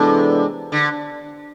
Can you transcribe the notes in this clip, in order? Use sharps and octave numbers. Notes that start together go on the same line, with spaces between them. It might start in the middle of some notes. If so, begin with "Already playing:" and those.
Already playing: C3 E3 G#3 B3 D4 A4
D3